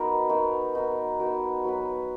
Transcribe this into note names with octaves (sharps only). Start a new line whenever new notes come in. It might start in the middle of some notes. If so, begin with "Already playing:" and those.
Already playing: B3 D#4 F#4 A#4
B3 D#4 F#4 A#4
B3 D#4 F#4 A#4
B3 D#4 F#4 A#4
F#3 B3 F#4 B4